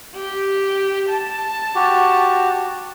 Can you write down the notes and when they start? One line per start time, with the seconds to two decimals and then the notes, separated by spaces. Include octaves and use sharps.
0.15 G4
1.09 A5
1.75 F#4 G4